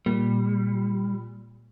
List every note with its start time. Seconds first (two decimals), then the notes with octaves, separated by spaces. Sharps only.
0.06 A#2 G3